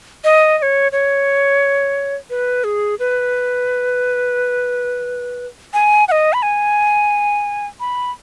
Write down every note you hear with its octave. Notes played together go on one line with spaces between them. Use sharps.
D#5
D#5
C#5
C#5
B4
G#4
B4
G#5
F#5
D#5
B5
G#5
B5